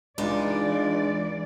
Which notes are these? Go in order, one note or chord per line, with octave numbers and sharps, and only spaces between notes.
C#2 E3 G#3 D4 D#4 F4 D5